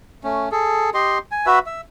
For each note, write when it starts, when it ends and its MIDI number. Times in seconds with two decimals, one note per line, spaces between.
0.24 0.49 57
0.24 0.49 61
0.52 0.90 68
0.52 0.90 69
0.94 1.18 67
0.94 1.18 75
0.94 1.18 84
1.31 1.46 80
1.46 1.59 66
1.46 1.59 71
1.46 1.59 76
1.66 1.81 76